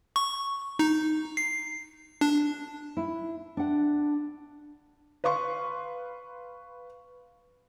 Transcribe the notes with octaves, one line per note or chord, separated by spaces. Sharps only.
C#6
D#4
C7
D4
E4
D4 F#5
B4 F5 C6 C#6